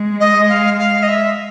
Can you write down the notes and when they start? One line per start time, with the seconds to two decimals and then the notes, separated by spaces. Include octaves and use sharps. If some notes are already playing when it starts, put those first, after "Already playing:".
Already playing: G#3
0.20 D#5
0.49 F5
0.79 F5
1.03 D#5
1.08 E5